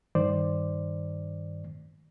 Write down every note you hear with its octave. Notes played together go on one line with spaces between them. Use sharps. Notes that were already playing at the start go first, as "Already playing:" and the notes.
G2 D#3 C5 D5